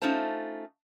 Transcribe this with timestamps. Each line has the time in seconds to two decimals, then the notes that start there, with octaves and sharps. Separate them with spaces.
0.02 A3 C#4 D#4 F4 C5 A5